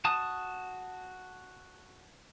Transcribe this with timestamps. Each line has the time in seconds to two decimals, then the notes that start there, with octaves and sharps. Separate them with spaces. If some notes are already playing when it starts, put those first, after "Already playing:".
0.05 F#4 A5 D#6